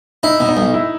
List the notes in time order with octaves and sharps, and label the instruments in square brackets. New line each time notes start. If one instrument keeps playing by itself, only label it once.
[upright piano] D#4 [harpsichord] E4
[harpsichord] B2
[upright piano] D#4
[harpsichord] B1
[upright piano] E4